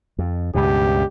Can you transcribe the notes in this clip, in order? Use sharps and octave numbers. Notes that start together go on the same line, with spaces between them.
F2
C#2 G2 B2 G4